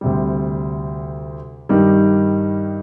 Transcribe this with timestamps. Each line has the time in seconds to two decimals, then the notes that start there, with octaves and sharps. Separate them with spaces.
0.01 D2 C3 G3
1.69 G2 D#3 G3